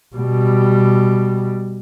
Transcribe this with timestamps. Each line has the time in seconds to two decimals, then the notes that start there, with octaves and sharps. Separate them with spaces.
0.16 B2 G3